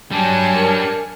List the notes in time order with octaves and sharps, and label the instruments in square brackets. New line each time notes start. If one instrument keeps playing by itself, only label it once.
[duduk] F#3 [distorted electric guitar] G3 D4 [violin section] G#5 A5 C#7
[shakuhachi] A#4